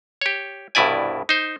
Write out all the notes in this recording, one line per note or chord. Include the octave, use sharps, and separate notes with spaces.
G4 C#5
C2 G2 B2 E4 D5 G#5
D#4 C5